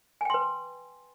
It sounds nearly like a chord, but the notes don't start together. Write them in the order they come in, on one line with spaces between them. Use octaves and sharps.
G#5 G5 C6 B4